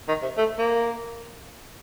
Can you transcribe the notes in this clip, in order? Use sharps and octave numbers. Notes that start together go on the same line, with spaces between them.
D#3
C3
A3
A#3